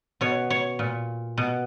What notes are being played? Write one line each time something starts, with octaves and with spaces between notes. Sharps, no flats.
B2 C#5
C#5
A#2
B2